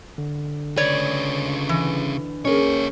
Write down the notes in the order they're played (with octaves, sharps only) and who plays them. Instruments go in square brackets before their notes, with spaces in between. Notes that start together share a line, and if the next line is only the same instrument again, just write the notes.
[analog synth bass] D3
[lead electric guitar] C#3 B4 [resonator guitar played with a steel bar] C#5 D5
[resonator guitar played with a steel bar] E3
[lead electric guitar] A#3 C#5 [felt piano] C#4 G#4 A#4